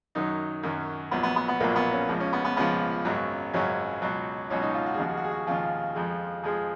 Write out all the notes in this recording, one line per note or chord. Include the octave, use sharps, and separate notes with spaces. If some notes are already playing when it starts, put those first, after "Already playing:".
F#2 D#3 F#3 D#4
F#2 D#3 F#3
A#1 A#2 F#3 B3
B3
B3
B3
A#1 A#2 F#3 A#3
B3
C#4
C#2 C#3 F3
C#4
B3
B3
C#2 C#3 F3 B3
G#1 F#2 C#3 F#3
G#1 F#2 C#3 F#3 C#4
C#2 B2 F#3
C#2 B2 F#3 C#4
D#4
F4
F#4
G#4
D#2 C#3 F3 F#4
G#4
F#4
G#4
F#4
D#2 C#3 F3 F4
F2 F3 G#3
F2 F3 G#3 G#4